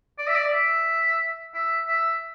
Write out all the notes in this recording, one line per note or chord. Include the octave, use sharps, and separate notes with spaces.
D5
E5
D5
E5
E5
E5